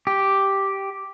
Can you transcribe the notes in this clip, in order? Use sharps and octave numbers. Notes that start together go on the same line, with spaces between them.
G4